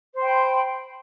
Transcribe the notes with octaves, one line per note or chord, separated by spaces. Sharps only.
C5 G5 B5 C6